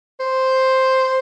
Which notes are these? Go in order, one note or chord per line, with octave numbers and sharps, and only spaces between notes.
C5